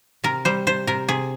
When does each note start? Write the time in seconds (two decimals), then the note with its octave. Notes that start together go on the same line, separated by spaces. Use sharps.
0.24 C3 A#4
0.45 G3 C5
0.67 C3 C5
0.87 C3 A#4
1.09 C3 G#4